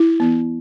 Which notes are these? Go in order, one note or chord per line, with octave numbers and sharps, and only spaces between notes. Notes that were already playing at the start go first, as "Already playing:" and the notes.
Already playing: E4
E3 B3